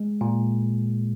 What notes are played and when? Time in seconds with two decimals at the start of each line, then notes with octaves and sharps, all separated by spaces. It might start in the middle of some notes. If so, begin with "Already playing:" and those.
Already playing: G#3
0.21 A#2